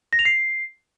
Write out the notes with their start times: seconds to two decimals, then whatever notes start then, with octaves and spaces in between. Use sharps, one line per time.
0.13 A#6
0.19 F7
0.25 C7